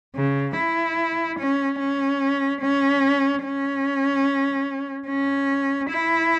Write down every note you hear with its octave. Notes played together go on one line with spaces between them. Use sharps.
C#3
E4
C#4
C#4
C#4
C#4
C#4
E4